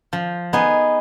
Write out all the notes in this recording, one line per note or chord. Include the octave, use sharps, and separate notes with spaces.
F3
B3 D#4 G#4